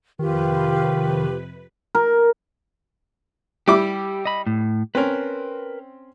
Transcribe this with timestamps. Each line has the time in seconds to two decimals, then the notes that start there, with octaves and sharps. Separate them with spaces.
0.19 F2 C3 D#3 F4 G4 B4
1.95 A#4
3.68 G3 E4 G4 D6
4.25 D#5 B5
4.47 A2
4.95 C4 C#4 A#4 B4